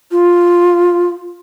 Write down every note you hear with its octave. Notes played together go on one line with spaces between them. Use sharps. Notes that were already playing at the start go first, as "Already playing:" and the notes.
F4